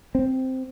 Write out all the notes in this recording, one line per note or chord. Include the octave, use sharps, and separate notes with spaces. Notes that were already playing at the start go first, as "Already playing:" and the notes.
C4